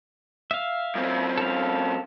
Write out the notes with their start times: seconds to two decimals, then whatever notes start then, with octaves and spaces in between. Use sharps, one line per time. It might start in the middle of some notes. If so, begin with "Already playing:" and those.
0.51 E5 F5
0.95 F#2 C4
1.38 A4 F5